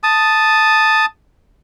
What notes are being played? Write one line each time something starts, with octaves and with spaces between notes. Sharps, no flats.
A5 D#6